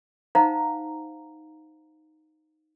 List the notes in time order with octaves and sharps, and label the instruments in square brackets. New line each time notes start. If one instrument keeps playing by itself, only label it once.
[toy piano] D#4 C5 F5 F#5 A#5